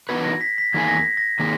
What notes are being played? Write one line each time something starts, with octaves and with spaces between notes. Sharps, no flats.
E3 B3 D#4 F#4 B4 G#6
A#6
B6
B6
E2 D#3 A#3 D#4 G#4 G#6
A#6
B6
A#6
D#3 A#3 D#4 G#4